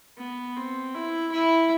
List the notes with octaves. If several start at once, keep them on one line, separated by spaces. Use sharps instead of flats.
B3
C4
E4
E4